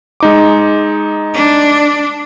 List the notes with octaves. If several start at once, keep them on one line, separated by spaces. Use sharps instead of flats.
G#3 D#4 D6
D4